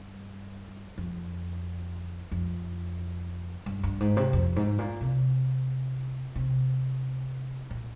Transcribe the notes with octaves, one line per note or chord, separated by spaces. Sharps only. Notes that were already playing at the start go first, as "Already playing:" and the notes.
Already playing: G2
F2
F2
G2
G2
G#2
C3
F2
G#2
A#2
C3
C3
A#2